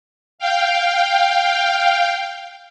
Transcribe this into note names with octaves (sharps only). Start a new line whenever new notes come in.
F5 G5